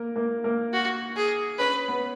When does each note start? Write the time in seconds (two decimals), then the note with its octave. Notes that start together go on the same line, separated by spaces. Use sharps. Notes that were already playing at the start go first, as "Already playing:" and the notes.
Already playing: A#3 A#4
0.16 A#3 A#4
0.44 A#3 A#4
0.73 F#4
1.17 G#4
1.59 C#4 B4 C#5
1.88 B3 B4